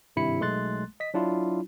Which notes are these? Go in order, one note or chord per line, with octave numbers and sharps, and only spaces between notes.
G#1 G2 C3 E4 B5 C#7
B1 G#3 A3 C6 F#6 A6
D#5 B6
F#3 D4 E4 F4